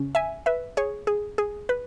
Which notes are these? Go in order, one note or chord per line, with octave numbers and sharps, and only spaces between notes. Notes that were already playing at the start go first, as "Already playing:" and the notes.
Already playing: C#3 C#4
E5 G#5
B4 E5
G#4 C#5
G#4
G#4
B4